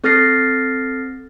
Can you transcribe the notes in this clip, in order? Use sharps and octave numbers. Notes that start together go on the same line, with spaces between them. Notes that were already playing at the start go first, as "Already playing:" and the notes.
C4 A4 F6 A6 A#6 C7